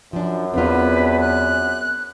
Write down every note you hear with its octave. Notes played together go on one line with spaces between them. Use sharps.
F#2 F3 D4
E2 C4 D4 F4 B4
F#6